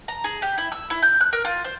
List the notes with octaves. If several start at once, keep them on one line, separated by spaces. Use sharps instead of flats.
A#5
G#4
G4
E4
E6
E4
G6
F#6
A#4
F4
C5